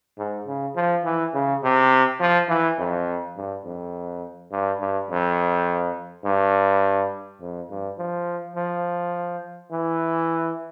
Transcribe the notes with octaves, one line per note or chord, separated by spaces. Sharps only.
G#2
C#3
F3
E3
C#3
C3
F3
E3
F2
G2
F2
G2
G2
F2
G2
F2
G2
F3
F3
E3